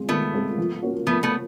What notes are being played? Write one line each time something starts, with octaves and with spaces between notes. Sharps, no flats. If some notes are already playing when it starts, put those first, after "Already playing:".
Already playing: G#3 C4 F4
D#3 A3 B3
G#3 C4 F4
F3
A#3 C#4 F#4
F3 A3 B3
A3 B3